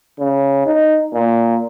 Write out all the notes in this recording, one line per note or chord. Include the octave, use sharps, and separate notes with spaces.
C#3
D#4
A#2